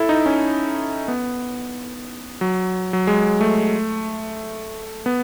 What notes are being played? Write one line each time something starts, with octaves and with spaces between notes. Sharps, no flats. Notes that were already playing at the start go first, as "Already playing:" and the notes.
Already playing: E4 A4
D#4
C#4
B3
F#3
F#3
G#3
A3
B3